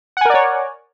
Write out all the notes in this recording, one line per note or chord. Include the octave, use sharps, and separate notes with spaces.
A#4 C#5 D5 F#5 G#5